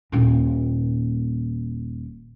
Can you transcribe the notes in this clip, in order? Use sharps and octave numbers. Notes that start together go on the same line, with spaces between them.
D#1 A#2